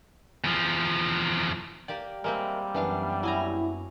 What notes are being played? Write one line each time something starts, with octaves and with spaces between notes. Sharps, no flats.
E2 F3
A#3 G4 D5 G5
G3 G#3 A#3 C4 A#4 E5
F#2 E3 B3 D4 F5
F#3 E4 G#5 A#5